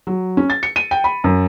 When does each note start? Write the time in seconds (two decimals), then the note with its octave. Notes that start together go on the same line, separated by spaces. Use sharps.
0.07 F#3
0.37 C#4
0.50 A6
0.63 C#7
0.76 D#7
0.91 G5
1.04 B5
1.24 F#2